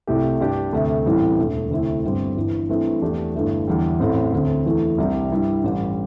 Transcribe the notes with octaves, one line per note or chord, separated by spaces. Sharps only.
C2 C3 A3 E4 G4
G2 G3 D4 G4
D2 C3 A3
A1 A2 E3 G3 C4
E1 D2 D3 A3
D2 C3 A3 C4 E4
G1 G2 G3 C4
G1 G2 E3
G2 E3 A3 C4
E2 E3 A3 D4 G4
G1 G2 E3 A3
E2 D3 G3
A1 A2 E3 C4
D2 D3 C4
E2 E3 A3
C2 C3 G3 D4
G2 G3 E4
A1 G2 G3